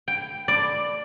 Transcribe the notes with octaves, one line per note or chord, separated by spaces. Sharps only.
G5
D5